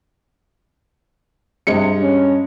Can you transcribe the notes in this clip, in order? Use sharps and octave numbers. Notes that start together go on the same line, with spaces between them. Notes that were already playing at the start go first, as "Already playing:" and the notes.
G2 C3 G#3 C#7
C#4